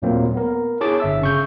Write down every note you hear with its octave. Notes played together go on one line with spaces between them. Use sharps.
D#2 A#2 F#3 A3 A#3 C4
B3 A#4
E4 G#4 C#5 A5 D6
G1 E5 E6
C#3 C#6 G6